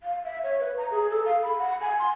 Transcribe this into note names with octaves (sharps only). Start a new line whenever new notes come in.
F5
E5
C#5
B4
A#5
G#4
A4
F5
B5
F#5
G#5
C6